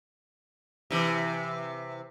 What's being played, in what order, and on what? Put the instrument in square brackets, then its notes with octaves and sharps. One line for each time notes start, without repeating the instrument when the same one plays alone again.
[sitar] C3 E3